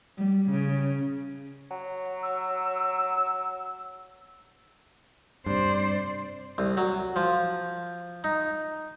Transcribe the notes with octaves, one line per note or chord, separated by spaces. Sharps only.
G3
C#3
F#3
E6
G2 C3 C5 D5
C2
F#3
F3
D#4